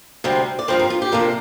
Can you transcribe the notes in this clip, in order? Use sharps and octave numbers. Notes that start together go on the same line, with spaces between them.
D2 C3 G3 C4
D5
G2 F3 C4 C5
A#4
F4
G4
C3 F3 A#3 D4